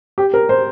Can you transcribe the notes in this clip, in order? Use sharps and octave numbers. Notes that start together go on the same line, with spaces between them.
G4
A#4
C5